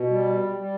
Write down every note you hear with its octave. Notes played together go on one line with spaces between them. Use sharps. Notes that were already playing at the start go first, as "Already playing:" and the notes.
Already playing: B2
G3
G3